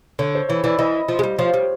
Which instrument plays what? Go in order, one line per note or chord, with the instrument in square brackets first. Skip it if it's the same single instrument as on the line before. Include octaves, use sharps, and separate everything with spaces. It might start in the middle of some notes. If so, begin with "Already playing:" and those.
[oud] D3 [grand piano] C#5
[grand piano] C5
[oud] E3 [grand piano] C#5
[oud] E3 [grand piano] D5
[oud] E3 [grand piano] D#5
[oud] F3
G#3
G3
[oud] F3 [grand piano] C#5
[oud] G3